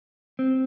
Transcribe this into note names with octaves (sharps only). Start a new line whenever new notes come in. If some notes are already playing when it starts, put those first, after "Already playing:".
C4